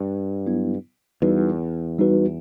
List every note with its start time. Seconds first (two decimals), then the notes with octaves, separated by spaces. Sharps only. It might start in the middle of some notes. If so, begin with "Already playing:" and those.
Already playing: G2
0.46 F#3 B3 E4
1.22 E2 G3 D#4 F#4 B4
1.98 G3 D#4 F#4 B4